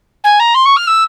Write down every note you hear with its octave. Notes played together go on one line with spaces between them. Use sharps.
G#5
A#5
C6
C#6
F6
E6